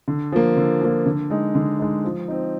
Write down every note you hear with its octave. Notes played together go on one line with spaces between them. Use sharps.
D3
F3 A#3
D3
F3 A#3
D3
G#3 D#4
D3
G#3 D#4
F3
C4 D#4